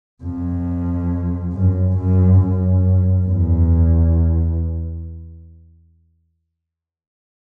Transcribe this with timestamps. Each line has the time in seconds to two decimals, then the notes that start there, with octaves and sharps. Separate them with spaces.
0.23 F2
1.53 F#2
1.97 F#2
2.40 F#2
3.26 E2